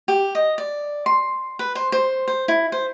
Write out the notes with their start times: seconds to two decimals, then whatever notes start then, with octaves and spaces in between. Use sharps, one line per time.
0.08 G4
0.35 D#5
0.58 D5
1.06 C6
1.59 B4
1.75 C5
1.92 C5
2.28 C5
2.48 E4
2.72 C5